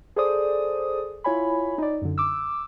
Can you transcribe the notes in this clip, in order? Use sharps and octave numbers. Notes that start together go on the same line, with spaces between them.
G#4 A4 C5 D5 D#6
E4 F4 C#5 G#5 B5
D#4 D5
F#2 D3
D6 E6